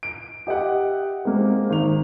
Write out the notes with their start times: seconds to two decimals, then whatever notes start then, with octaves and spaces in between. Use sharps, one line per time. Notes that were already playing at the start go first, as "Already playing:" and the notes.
0.03 D7
0.47 G4 D#5 E5 F#5
1.25 G#3 A#3 C4
1.70 G#1 F7